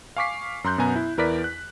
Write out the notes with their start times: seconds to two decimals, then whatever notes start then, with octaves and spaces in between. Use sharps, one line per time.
0.17 F5 G#5 C#6 D6 B6 C7
0.64 F#2 A#5 C6 F#6 G6
0.78 F#2 B2 B3 G#5 A#5
0.96 E4
1.17 E2 E4 A#4 B4 D5 B6
1.44 F#6